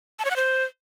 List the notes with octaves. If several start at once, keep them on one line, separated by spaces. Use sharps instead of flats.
A5
C#5
F#5
C5